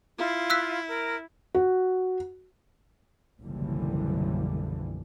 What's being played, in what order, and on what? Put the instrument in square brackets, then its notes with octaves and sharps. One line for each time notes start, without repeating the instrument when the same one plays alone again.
[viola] E4 [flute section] F4
[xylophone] E6 F#6 B6
[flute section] A#4
[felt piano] F#4
[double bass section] F#1 B1 D3 E3 F3 G3